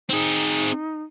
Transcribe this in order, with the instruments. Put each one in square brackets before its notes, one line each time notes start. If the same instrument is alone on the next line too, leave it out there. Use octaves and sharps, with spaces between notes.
[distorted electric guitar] C4 G#4 [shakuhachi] D#4